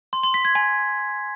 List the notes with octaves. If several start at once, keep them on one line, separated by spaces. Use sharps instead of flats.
C6
C6
B6
G#6
G#5